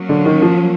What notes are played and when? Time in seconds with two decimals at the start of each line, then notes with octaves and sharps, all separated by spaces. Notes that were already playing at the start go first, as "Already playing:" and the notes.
Already playing: F#3 A#3 C#4
0.09 D3
0.25 D#3
0.42 F3